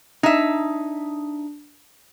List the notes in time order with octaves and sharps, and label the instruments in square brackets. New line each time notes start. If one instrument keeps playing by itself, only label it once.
[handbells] D4 [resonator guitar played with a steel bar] D#4 E5